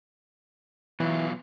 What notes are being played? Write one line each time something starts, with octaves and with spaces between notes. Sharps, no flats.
B2 E3 F#3 F4